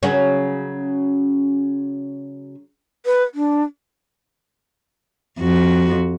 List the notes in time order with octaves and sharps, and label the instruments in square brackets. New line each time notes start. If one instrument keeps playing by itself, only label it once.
[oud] C#3 F#3 C#4
[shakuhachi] B4
D4
[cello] F2 F#4